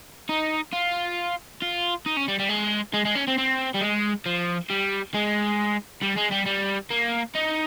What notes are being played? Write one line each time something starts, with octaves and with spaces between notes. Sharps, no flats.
D#4
F4
F4
D#4
C#4
G3
G3
G#3
G#3
G#3
C#4
C4
C4
G3
G#3
F3
G3
G#3
G3
G#3
G3
G3
A#3
D#4